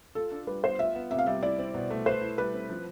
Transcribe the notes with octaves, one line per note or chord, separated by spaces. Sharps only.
F4 A4
D4
G3 B4
B3 C5
F4 E5
B3
C3 E5
F5
G3 E5
E4 D5
C4
B2
A3
B4 C5
E4
G3 B4
C4
F3